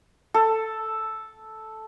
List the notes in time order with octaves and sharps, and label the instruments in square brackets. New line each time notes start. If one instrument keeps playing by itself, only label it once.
[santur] A4